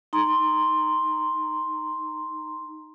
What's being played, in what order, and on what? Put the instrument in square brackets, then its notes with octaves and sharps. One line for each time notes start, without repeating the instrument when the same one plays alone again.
[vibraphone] D#4 A#5 C6